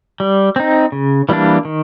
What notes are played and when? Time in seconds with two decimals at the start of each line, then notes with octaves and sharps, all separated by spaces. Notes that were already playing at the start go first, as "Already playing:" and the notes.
0.20 G3
0.56 C4 D#4
0.92 C#3
1.29 E3 G3 A#3 D4
1.65 D#3